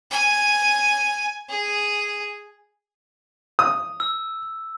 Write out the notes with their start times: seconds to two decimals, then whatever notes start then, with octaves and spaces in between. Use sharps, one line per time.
0.11 G#5
1.49 G#4
3.59 D#6
4.00 E6